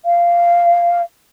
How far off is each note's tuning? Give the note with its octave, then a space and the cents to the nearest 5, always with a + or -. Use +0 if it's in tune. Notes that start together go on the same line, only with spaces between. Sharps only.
F5 -10